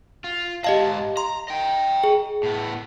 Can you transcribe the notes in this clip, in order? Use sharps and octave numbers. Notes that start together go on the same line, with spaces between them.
F4
G#2 G4 D#5 F5 A5
A#5 C6
D#5 G5
G#4
A2 B3